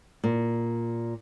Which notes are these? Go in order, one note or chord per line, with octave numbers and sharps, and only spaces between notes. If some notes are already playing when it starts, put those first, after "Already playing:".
A#2